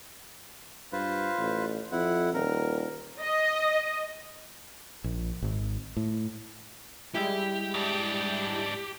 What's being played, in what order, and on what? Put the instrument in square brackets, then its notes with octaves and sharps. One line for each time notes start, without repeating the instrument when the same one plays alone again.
[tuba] G2 [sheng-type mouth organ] F4 B4 C5
[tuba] A1
[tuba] F2 [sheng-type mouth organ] E4 F#5
[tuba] D#1 [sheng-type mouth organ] A#4
[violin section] D#5
[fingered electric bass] A#1
G#1
A2
[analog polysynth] G3 G#3 E4 [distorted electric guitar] G4
[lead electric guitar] G#2 D4